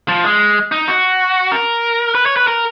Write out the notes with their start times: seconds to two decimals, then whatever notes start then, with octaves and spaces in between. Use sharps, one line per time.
0.08 F3
0.24 G#3
0.72 D#4
0.88 F#4
1.52 A#4
2.15 B4
2.26 C#5
2.37 B4
2.47 A#4